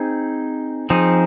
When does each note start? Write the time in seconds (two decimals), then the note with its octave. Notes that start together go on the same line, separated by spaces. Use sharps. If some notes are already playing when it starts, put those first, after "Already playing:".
Already playing: C4 D#4 G#4
0.90 F3 C4 D#4 G#4